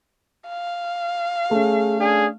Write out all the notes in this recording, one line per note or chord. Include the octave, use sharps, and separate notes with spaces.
F5
A3 C#4 G#4
D4 G#4